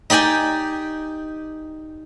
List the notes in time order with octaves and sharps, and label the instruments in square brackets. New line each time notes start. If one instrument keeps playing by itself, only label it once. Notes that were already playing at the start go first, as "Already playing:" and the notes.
[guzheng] D#4 G4 D5 G5 G#5